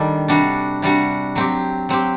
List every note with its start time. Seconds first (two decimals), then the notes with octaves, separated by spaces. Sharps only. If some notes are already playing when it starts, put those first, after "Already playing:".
Already playing: D#3 G3 D4 A4
0.28 C3 G3 D4 F#4
0.82 C3 G3 D4 F#4
1.35 F#3 C4 G4
1.89 F#3 C4 G4